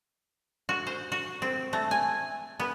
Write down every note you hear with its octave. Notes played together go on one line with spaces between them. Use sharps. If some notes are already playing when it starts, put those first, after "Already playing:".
F#4
C5
F#4
C4
A3
G#5
B3